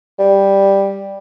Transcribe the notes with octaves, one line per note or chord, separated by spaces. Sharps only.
G3